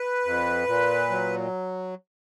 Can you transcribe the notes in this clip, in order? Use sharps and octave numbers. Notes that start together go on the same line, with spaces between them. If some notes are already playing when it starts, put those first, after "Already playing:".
Already playing: B4
F2
A#2
F#3